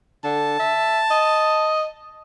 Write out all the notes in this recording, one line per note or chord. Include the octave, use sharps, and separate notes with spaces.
D3 A5
E5
D#5